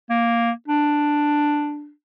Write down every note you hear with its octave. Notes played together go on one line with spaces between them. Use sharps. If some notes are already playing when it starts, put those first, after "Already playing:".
A#3
D4